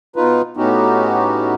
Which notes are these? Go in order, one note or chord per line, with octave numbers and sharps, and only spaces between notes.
B2 D#4 F4 B4
A2 B3 C#4 D#4 F#4 G4